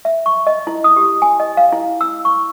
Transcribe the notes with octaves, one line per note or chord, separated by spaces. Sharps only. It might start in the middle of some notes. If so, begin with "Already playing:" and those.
E5
C#6
D#5
E4
D#6
G4
G#5
D#5
F5
E4
E6
C#6